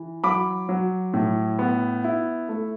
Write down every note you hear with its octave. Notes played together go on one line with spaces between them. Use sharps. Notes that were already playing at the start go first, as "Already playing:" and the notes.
Already playing: E3
F#3 B5 D6
F#3
A2
B3
E4
A3